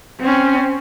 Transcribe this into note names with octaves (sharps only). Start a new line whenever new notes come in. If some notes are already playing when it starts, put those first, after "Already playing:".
C4 C#4